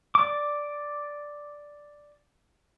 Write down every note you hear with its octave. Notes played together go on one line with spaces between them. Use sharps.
D5 D6